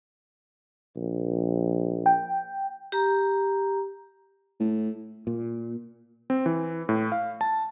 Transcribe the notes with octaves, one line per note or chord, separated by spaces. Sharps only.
A#1
G5
G4 A#5
A2
A#2
C4
E3
A2
F5
A5